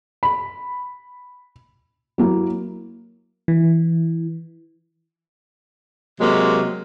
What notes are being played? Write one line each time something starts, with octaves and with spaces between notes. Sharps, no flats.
B5
F#3 A#3 E4
E3
C3 F#3 G#3 A#3